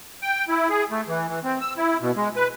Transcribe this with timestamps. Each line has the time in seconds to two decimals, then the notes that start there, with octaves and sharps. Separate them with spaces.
0.22 G5
0.48 E4
0.70 G#4
0.91 A3
1.08 E3
1.28 E3
1.44 C4
1.61 E6
1.77 E4
2.01 B2
2.16 G#3
2.36 B4